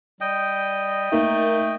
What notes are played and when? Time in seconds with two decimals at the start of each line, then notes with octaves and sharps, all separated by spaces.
0.21 G3 D#5 G5
1.12 A3 A#3 D#4 A#4